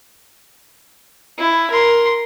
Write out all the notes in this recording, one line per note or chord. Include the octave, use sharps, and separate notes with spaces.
E4
A#4 C6